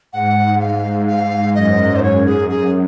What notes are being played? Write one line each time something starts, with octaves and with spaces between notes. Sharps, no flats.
G#2 F#5
F5
G#2 F5
F#2 D#5
C5
F#2 C#5
G#4
F#2
G#4